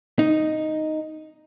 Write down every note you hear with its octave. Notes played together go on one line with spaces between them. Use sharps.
D#4